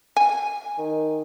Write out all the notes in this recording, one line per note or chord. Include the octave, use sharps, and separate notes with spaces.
G#5
D#3